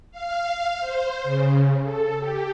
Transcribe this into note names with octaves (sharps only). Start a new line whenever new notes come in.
F5
C5
C#3
A4
G4